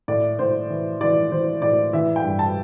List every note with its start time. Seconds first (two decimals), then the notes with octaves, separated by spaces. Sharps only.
0.08 A2 D5
0.39 A2 C5
0.70 E3
1.01 E3 D5
1.31 E3 C5
1.62 A2 D5
1.93 E3 E5
2.16 G5
2.23 G2
2.39 A5